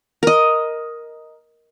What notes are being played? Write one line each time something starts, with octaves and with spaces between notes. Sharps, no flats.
A#4 D#5